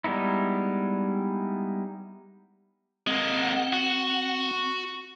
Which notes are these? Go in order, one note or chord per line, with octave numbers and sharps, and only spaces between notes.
G3 G#3 B3 D#4 E4
G#3 A#3 C4 F#5
F#4